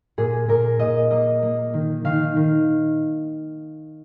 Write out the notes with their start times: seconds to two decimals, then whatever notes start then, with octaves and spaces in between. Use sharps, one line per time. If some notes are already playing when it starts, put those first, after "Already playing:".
0.18 A#2 G#4
0.48 A#2 A#4
0.79 A#2 D#5
1.11 A#3 D#5
1.43 A#3
1.74 D#3
2.05 D#3 F5
2.36 D#3